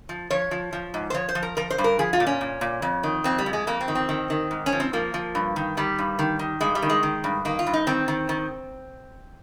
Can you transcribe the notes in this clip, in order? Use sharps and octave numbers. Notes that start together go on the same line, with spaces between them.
F3
F3 C#5
F3
F3
G#2
C5
F3 C#5
C5
F3
A#4
F3 A#4
C5
G2
A#4
F3 G#4
F4
A#2
C#4
A#2
A#2
F2
D#3
F2 C4
G3
F2
G#3
F2 A#3
C4
D#3
C4
D#3
D#3
G#2
C#4
F3
C4
F3 A#3
F3
G2
D#3
D#3 G3
G2
D#3
D#3
G2 G#3
G3
D#3
G#3
D#3
G2
D#3 A#3
F4
G2
D#4
D#3 C4
D#3
D#3